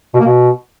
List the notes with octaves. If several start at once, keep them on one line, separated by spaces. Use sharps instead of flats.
B2
A#3
B2